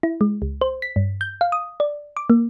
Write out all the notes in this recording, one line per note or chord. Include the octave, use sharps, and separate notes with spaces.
E4
G#3
C#2
C5
B6
G2
G6
F5
D#6
D5
D6
A#3